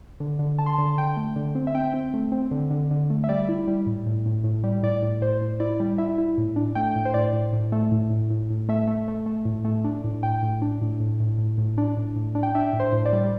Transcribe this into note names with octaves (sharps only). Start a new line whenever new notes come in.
D3
D3
D3 A5
C6
D3 A5
D3 G5
A3
D3
C4
E5
C4 G5
C4
A3
C4
D3
D3
D3
A3
E5
G3 D5
E4
G3
A2
A2
A2
A2
G3
A2 D5
A2
A2 C5
A2
E4 D5
G3
E4 E5
E4
A2
D4
A3 G5
A2
C5
A2 D5
A2
A2
A3
A2
A2
A2
A2
A3 E5
A3
A3
A3
A2
A3
D4
A2
A2 G5
A2
D4
A2
A2
A2
A2
A2
D4
A2
A2
D4
G5
D4 E5
A2
C5
A2
D5
G3